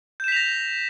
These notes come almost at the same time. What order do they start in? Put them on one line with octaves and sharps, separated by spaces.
G6 E7 B6 F7 A#6